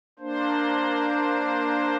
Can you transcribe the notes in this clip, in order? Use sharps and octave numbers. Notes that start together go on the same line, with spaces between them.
A#3 D4 C5